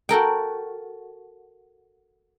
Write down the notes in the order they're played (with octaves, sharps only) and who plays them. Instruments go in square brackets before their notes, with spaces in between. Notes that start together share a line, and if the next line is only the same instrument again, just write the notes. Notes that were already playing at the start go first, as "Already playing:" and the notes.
[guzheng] F#4 A4 A#4 G5